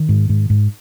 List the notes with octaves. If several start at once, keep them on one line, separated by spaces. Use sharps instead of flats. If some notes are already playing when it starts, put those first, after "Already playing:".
Already playing: D#3
G#2
G#2
G#2